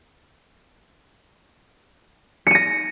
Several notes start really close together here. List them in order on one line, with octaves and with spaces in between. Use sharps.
C#7 D#7 A#6